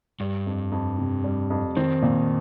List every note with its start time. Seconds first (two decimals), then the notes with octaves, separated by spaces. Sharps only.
0.20 G2 G3
0.47 F2
0.72 F2
0.98 C3
1.24 G3
1.50 F2
1.76 D#3 C4
2.02 A#2